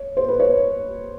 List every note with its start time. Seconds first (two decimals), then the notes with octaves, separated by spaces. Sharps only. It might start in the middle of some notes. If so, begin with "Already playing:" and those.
Already playing: C#5
0.17 C5
0.28 B4
0.40 C#5